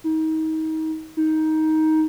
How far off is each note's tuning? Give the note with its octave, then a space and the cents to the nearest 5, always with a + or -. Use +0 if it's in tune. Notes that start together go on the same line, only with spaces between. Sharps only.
D#4 +30
D#4 +15